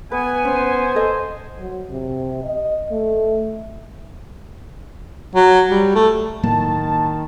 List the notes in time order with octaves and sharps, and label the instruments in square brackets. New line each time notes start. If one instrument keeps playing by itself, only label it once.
[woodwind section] B3 G#5 [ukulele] B4
[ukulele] C#4 [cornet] C5
[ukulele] A4 D#5
[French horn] F#3
C3
D#5
A3
[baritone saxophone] F#3
G3
A3
[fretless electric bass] A2 F#3 A#3 [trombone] D#3 [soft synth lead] A5